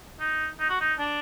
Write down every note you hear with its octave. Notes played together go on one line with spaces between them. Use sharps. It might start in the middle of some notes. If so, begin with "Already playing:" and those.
D#4
D#4
F#4
D#4
D4